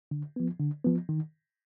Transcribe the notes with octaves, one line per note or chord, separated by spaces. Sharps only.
D3
F3 B3
D3
F3 B3
D#3